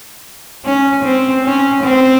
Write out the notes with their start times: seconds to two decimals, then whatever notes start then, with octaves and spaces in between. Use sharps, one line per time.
0.66 C#4
1.05 C4
1.45 C#4
1.83 C4